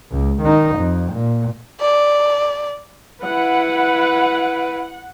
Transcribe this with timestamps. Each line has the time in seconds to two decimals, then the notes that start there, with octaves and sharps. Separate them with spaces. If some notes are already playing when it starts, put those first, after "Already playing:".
0.11 C#2
0.41 D#3 D#4
0.76 F2
1.13 A#2
1.81 D5
3.24 E4 B4 F#5